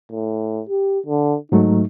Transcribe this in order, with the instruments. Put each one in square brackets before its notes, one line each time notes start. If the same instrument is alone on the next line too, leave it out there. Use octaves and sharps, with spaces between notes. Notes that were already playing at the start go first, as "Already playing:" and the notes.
[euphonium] A2
G4
D3
[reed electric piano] G#2 F#3 A3 [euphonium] D#4